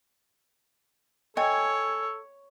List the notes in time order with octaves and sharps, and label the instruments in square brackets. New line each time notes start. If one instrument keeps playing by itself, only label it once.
[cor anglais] A4 [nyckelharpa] C#5 [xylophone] D#5 G5 [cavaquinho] G#5